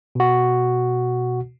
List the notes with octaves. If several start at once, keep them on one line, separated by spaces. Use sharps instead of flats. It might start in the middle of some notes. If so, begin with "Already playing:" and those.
B2 F#4